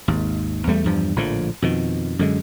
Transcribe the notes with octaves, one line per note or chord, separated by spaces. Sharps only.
G#1 D#2
E2 G3 A3
E2 G2 F3
A#1 A2 D3 F3
F2 B2 D#3
F#2 D3 G#3